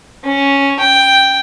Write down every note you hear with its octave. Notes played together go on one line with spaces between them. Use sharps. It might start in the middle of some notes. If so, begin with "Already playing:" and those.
C#4
G5